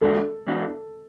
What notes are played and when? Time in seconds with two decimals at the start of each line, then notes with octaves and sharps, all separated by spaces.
0.01 E2 D3 G#3 D4 F#4 A4
0.47 G#2 E3 B3 D4 F#4